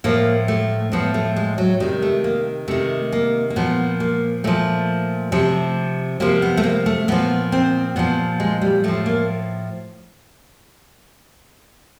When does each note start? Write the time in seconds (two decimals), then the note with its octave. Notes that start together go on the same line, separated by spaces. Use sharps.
0.04 A2 F3 A#3
0.48 A3
0.92 A2 F3 B3
1.14 A3
1.36 G#3
1.58 F#3
1.80 C3 D#3 G3
2.02 A3
2.24 A#3
2.68 C3 D#3 A3
3.12 A#3
3.50 A#3
3.56 A#2 F3 B3
4.00 A#3
4.44 A#2 F3 A3
5.32 C3 F3
6.20 C3 F3 A#3
6.42 B3
6.57 A3
6.64 A#3
6.86 A3
7.08 A#2 F3 B3
7.52 C4
7.96 A#2 F3 B3
8.40 G#3
8.62 G3
8.84 A2 F3 A3
9.06 A#3